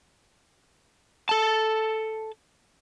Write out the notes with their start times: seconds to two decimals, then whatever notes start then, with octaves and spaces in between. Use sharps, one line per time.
1.29 A4 A5